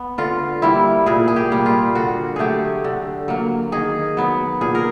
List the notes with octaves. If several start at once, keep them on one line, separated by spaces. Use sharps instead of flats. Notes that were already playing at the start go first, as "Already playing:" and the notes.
Already playing: B3
D3 F4
G3 A#3 E4
A#2 G#4
G#4
G4
G3 A#3
F4
D3 F#4
F#3 A3 G4 G#4
D3
F#3 A#3
D#3 G#4
F#3 B3
A#2 G#4
A#4